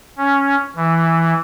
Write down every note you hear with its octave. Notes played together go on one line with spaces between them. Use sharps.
C#4
E3